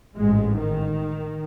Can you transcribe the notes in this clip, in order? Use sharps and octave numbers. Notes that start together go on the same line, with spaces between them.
A1 G#2 G#3
D#3